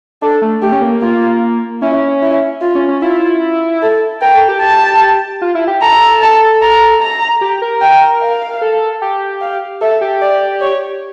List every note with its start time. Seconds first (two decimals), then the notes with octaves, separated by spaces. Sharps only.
0.22 D4 A4
0.42 A3
0.62 A3 G4
0.72 C#4
0.82 A#3
1.02 A#3 F4
1.82 C#4 E4
2.22 E4
2.61 F4
2.75 C#4
2.88 C#4
3.02 E4 F4
3.82 A4
4.22 A#4 G5
4.35 A4
4.48 G4
4.62 G4 A5
5.42 F4
5.55 E4
5.68 G4
5.82 A4 A#5
6.22 A5
6.62 A#5
7.01 A#5
7.41 G4
7.62 A#4
7.81 G5
8.21 F5
8.62 A4
9.02 G4
9.42 F5
9.81 A4 E5
10.01 G4
10.21 D5
10.61 C#5